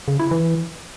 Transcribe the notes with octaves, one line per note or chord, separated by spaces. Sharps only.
C#3
E4
E3